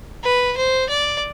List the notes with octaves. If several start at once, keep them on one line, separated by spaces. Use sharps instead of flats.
B4
C5
D5